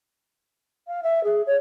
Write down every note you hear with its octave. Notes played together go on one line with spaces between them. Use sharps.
F5
E5
G#4
C#5